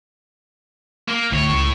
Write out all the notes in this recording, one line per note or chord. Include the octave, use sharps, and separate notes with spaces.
A#3
D2 A2 C#5
C#2